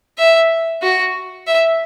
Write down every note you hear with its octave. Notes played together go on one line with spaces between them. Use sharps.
E5
F#4
E5